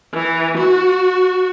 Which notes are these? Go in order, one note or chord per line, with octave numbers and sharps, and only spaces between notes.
E3
F#4